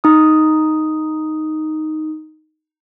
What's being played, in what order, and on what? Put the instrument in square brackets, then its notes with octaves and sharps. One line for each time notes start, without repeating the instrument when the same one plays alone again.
[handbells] D#4 D#6